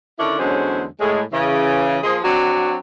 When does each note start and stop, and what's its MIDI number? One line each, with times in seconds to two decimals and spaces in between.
0.19 0.39 50
0.19 0.39 51
0.19 0.39 61
0.19 0.39 62
0.19 0.39 64
0.39 0.85 40
0.39 0.85 50
0.39 0.85 54
0.39 0.85 56
0.39 0.85 61
0.39 0.85 72
1.01 1.22 45
1.01 1.22 56
1.33 1.98 49
1.33 1.98 52
2.03 2.18 53
2.03 2.18 58
2.03 2.18 68
2.03 2.18 72
2.03 2.18 75
2.24 2.76 54
2.24 2.76 60
2.24 2.76 62
2.24 2.76 66